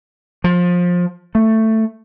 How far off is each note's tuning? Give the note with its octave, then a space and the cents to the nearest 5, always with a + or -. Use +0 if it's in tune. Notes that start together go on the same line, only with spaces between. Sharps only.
F3 +20
A3 +10